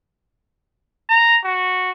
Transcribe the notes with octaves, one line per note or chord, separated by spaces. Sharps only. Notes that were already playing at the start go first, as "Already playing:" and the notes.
A#5
F#4